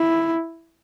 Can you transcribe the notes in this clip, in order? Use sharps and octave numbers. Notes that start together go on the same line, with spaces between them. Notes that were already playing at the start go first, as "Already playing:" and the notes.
Already playing: E4